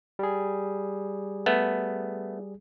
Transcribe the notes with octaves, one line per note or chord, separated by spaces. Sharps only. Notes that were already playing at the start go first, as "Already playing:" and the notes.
G3 G#4
A3 B3